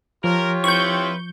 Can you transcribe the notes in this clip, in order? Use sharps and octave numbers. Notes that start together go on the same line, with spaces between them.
F3 F4 G4 A#4 C#5
C4 E4 B4 C#6 G6